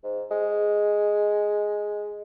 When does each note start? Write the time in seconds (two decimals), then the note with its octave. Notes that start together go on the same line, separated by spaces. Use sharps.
0.04 G#2
0.31 G#3